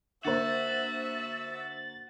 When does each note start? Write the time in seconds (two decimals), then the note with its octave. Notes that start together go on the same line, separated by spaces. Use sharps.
0.25 D3 A#3 F#4 C5 E5 A6